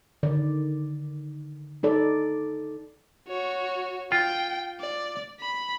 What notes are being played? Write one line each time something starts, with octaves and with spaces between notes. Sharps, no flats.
D3 D#3 D5
D#4 A4 D5
F#4 C#5
F4 G5
D5
B5